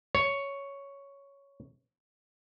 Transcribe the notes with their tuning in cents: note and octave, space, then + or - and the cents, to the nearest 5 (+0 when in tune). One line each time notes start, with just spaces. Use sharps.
C#5 +5